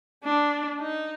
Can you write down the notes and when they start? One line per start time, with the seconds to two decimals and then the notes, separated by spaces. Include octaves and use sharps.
0.24 D4
0.81 D#4